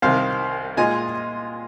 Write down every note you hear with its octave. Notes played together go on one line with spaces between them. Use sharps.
C2 C3 D#3 C5 F5
A#2 G#3 F4 D#5 G#5